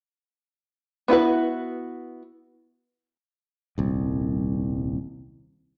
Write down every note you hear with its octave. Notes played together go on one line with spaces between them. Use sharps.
B3 E4 F#4 B4
D#1 C2